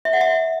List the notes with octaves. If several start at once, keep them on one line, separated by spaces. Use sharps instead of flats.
E5
F#5
E5